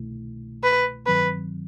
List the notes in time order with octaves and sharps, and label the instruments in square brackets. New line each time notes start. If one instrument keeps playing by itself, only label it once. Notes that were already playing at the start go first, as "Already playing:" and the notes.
Already playing: [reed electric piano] C2 B2 A3 E4
[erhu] B4
[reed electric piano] G2 D#3 F#3 C4 [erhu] B4